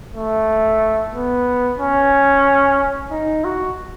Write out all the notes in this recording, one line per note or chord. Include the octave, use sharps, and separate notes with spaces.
A3
B3
C#4
D#4
F#4